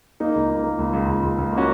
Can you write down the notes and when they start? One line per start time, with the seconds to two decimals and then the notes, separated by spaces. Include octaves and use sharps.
0.20 A#3 D#4
0.35 C#2
0.50 A#3
0.64 A#3
0.78 C#2
0.93 C#2
1.08 C#2
1.23 C#2
1.38 C#2
1.53 A#3 C#4 F#4